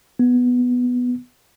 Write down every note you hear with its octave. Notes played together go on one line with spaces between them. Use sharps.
B3